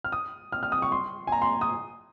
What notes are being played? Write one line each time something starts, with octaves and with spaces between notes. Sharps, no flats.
F6
D#6
F6
F6
D#6
C#6
C6
G#5
A#5
C6
D#6